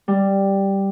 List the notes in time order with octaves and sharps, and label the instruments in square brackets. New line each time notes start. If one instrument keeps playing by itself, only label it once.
[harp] G3